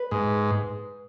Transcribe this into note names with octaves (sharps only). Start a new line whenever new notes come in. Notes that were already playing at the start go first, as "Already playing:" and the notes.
Already playing: B4
G#2